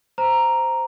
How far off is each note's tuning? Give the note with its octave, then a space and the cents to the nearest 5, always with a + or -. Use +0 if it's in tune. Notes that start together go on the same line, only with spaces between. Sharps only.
C5 -10 A#5 +0